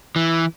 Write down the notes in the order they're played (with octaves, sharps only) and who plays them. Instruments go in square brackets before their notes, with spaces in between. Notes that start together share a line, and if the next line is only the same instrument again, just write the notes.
[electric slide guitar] E3